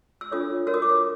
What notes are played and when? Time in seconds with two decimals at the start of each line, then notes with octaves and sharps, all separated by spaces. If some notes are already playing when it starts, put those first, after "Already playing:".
0.21 E6
0.31 D4 F4 A4 C#5 D#6
0.67 F#4 A#4 C#5 E6
0.74 D#6
0.82 D6
0.89 D#6